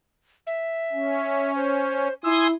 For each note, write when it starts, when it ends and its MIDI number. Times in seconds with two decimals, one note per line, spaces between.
0.47 1.52 76
0.92 2.08 61
1.56 2.13 72
2.24 2.53 64
2.24 2.47 80
2.24 2.47 84
2.24 2.47 87
2.24 2.49 88